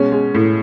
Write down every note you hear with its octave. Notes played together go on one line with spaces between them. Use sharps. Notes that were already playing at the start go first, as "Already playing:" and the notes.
Already playing: B2 G#3 C#4
G#3
A2